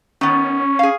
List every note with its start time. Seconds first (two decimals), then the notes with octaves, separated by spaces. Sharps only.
0.21 D#3 B3 C#4 C#6
0.79 G#4 F5